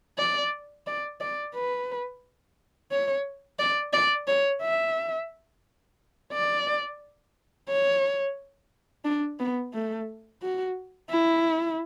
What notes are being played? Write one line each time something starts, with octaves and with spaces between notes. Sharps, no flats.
D5
D5
D5
B4
C#5
D5
D5
C#5
E5
D5
C#5
D4
B3
A3
F#4
E4